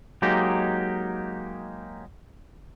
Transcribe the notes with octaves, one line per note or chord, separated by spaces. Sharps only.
F#3 G#3 A#3 D#4 G4